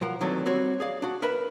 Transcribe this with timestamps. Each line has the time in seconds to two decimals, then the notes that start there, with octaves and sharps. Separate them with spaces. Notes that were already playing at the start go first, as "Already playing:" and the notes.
0.01 B1 F3 A#4 F#5
0.21 D#3 E3 F#3 A3 C4 D4
0.45 G3 C4 F#4 C#5
0.80 G#4 D5 F5
1.02 D4 F#4
1.22 A#4 B4 E5 B5